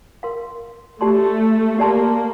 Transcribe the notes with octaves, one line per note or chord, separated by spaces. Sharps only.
A#4 F5 C6
A3 G4 D5 A5 C6
A#3 G4 D5 A5 C6